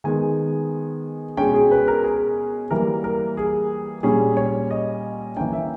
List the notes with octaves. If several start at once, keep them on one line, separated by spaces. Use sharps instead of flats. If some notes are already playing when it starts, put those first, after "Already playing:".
D#3 G#3 B3 G#5
B2 G#3 C#4 G5
G#4
B4
A#4
G#4
E3 G3 A#3 A#4
A#4
G#4
A#2 G3 C#4 G#4
C#5
D#5
E3 A#3 C#4 G5
E5